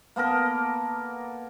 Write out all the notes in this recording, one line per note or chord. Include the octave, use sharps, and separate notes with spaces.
A#3 B3 A4 A#4